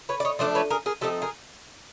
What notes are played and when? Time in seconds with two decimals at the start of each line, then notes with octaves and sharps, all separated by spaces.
0.09 B4 C#5
0.20 D5
0.25 C#5 D#5
0.39 F3 A3 D4 C5 D5
0.55 B4 C#5
0.70 G#4 A#4
0.86 G#4 A#4
1.01 F3 A3 C4 D#4 G4 A4
1.22 G#4 A#4